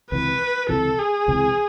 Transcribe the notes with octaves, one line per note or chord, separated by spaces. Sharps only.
C#2 C3 E3 B4
C#2 C3 E3 A4
G#4
C#2 C3 E3